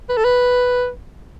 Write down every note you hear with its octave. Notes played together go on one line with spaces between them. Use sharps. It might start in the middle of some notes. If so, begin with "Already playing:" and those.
B4
A4
B4